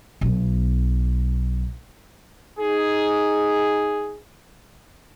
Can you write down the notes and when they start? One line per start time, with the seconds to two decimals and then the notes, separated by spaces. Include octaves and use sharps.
0.21 B1 B2
2.59 D#4 G#4